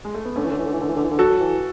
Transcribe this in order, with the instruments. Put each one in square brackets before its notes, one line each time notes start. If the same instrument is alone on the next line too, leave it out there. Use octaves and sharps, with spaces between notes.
[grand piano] G#3
A3
B3
[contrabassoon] D3 [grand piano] A3 C#4
[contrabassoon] E3
D3
E3
D3
E3
D3
E3
D3
E3
D3
[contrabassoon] F#3 [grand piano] F#4 A4
[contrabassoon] E3